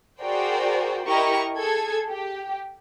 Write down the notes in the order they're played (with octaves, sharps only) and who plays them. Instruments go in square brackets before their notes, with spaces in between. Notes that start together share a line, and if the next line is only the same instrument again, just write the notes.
[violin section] F#4 G#4 A#4 C5 D5 G5
E4 G4 A#4 D#5 A#5 C#6
G#4 A4 G#6
G4